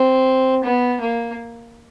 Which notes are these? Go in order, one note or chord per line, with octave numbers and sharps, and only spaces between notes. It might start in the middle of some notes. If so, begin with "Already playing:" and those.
Already playing: C4
B3
A#3